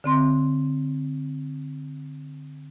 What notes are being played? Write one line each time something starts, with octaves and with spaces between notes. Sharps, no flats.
D3 C4 C6